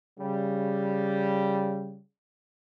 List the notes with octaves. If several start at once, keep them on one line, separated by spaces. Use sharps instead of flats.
C#3 G3